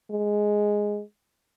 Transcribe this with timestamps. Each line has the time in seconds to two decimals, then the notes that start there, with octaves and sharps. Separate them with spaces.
0.11 G#3